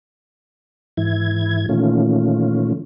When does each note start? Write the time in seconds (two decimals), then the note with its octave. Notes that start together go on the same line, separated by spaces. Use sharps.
0.97 G#2 E3 E4 G#6
1.69 A#2 D#3 E3 A3 C#4 F4